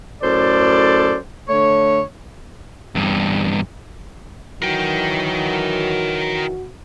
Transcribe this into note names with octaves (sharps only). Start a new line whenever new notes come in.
F#2 A2 A4 C5 D5
D3 A3 C#5
E2 G2
D#3 E3 F#3 F#4 A#4 G5